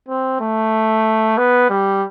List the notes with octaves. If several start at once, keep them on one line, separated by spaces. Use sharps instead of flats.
C4
A3
B3
G3